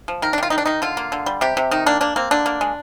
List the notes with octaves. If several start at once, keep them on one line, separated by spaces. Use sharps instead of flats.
F3
D#3 A#4
D4
D#3 F4
D#3 D#4
D4
D#3 D#4
D3 F4
A#3
D3
G3
C3 G4
C3
D#3 D#4
A#3 D4
A#3 D4
A#3 C4
D3 D4
A#3
G#3